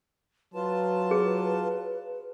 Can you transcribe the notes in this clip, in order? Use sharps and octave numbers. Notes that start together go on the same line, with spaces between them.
F#3 F4 B4 A5
G#4